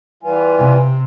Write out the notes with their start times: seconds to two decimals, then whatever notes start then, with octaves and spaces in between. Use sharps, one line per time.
0.23 E3 G3 F4 B4 G#5
0.58 C3